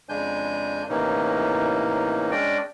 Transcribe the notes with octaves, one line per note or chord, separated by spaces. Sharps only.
F2 C#3 G#3 D4 G#5 G6
A2 C3 E3 A#3 C#4 D#4
G#3 C#4 D4 D5 D#5 G5